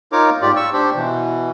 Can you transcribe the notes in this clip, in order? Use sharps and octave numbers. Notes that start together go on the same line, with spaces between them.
D#4 F4 A#4 C#5 D6
G#2 F4 G4 D5
C#6 E6
D4 G4 C5
B2 E3